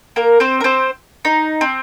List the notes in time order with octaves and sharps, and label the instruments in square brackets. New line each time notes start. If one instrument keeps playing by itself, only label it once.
[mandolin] A#3 A#4
C4 C5
A#4
C4 C5
D#4
C4